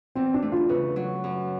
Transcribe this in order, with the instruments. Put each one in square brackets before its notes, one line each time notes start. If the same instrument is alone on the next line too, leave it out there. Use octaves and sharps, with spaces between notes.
[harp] E2 [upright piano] C4
[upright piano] D4
[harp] A3
[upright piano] F4
[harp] C#3 [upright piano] B4
[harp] F#3
F#2